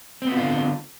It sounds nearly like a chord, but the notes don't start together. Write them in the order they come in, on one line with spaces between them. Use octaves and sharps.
C4 B3 F#4 F4 D3